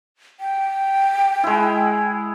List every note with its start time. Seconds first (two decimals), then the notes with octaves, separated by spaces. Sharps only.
0.40 G5
1.43 G#3 E4